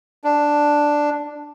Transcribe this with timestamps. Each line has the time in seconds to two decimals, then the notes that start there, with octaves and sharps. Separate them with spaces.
0.24 D4